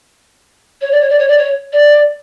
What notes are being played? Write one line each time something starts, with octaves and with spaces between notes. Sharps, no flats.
C#5
D5
C#5
D5
C#5
D5
C#5
D5